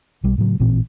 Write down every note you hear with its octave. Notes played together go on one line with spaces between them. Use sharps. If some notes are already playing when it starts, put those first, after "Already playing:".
B1 G3
A2 C#3 F#3
A1 A#2 E3 C4